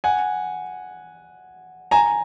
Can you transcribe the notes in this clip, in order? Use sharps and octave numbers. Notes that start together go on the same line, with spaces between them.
F#5 G#5
G#5 A#5